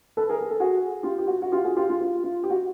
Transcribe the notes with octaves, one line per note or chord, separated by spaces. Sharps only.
A4 B4
G#4 A#4
G#4
A4
F#4 G#4
F4 G4
G4
F#4
F#4
F4 G4
F#4 G#4
F4 G4
F4
F4
F4
G4
F#4